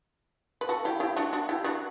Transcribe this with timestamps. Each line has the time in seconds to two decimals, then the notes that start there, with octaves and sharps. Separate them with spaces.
0.61 B4
0.69 F#4 A4
0.85 E4 G4
1.00 E4 G4
1.16 D4 F#4
1.33 D4 F#4
1.49 E4 G4
1.64 D4 F#4